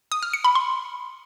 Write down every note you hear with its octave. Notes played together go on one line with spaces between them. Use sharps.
D#6
F6
C#7
B5
C6